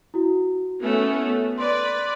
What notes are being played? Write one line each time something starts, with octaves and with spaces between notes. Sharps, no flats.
E4 F#4
A3 B3 C#4
B4 D5 C6